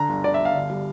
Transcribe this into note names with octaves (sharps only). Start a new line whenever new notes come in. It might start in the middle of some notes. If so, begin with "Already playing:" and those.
Already playing: D3 A#5
G1
D3 D5
E5
G1
F5
D3
G3